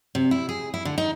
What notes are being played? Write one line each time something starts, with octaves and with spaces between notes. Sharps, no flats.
C3
E4
G#4
E4
D3
D#4